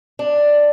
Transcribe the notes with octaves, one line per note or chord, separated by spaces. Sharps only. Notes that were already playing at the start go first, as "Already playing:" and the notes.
D4